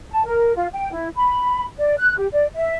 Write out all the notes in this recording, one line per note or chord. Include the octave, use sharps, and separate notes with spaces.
A5
A#4
F4
G5
E4
B5
D5
F#6
G4
D5
E5